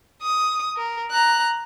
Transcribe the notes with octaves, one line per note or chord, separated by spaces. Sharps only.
D#6
A#4
A#5 F#6